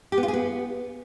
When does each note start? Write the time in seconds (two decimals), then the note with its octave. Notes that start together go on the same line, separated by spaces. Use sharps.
0.12 G4
0.18 B3
0.23 F4
0.28 G#4
0.34 B3